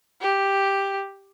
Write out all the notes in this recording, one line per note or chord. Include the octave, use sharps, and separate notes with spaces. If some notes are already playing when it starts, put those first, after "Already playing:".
G4